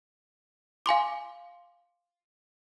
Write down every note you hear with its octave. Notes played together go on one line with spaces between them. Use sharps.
F5 G#5 C6 D6